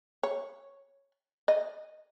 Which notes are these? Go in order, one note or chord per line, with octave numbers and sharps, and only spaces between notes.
C#5
D#5